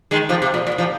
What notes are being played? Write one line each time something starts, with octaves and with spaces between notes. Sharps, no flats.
D#3 G#3
C3 F3
C3
A#2
A#2
C3 F3